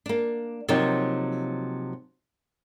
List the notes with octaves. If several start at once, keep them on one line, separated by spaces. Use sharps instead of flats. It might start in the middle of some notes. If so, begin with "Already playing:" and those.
A#3 D4
C3 F3 F#3 A#3 D#4 C#5